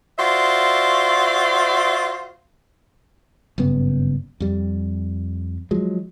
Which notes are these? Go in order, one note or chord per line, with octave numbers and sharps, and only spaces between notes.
F4 F#4 C5 D5 E5
F#1 G2 C#3 B3
F2 G3
F3 F#3 G#3